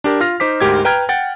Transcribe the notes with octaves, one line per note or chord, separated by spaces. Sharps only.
D4 G4 A#4
F4 F6 A#6
D#4 C5 D6 B6
D2 G#2 G4 A#4 G#6
B4 G5 A#5 F6 G#6
F#5 G5 A6